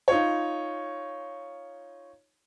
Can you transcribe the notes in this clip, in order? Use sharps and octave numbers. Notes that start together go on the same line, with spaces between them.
D#4 F4 C#5